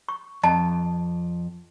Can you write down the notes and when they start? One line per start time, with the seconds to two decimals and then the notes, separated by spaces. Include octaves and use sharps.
0.09 C#6
0.43 F2 D#5 A5